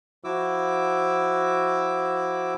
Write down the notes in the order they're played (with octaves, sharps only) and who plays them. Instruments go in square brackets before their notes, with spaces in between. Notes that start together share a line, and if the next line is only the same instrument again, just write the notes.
[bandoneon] F3 E4 F#4 D6 E6